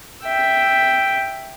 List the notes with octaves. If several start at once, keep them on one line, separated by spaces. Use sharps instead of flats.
E5 G5